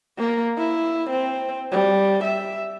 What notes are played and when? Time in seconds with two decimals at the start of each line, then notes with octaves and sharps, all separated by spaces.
0.18 A#3
0.57 E4
1.10 C4
1.72 G3
2.24 E5